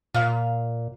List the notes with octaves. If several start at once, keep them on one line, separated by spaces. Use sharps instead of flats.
A#2 F4 F5